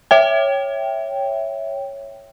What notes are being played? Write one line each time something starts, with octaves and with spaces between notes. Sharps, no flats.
C#5 E5 G5